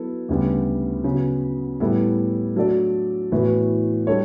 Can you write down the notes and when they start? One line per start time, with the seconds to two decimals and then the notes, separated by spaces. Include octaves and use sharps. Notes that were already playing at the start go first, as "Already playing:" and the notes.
Already playing: F#3 B3 E4 A4
0.29 D2 C#3 G3 B3
1.04 C#3 F#3 B3
1.80 A2 G3 B3 E4 A4
2.56 F#3 A3 D4 A4 D5
3.32 A2 E3 B3 F#4 B4
4.07 G3 D4 A4 C#5